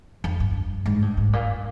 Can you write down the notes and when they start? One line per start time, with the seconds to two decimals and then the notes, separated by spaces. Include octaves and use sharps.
0.24 F2
0.40 G2
0.86 G#2
1.02 G2
1.17 G#2
1.33 A#2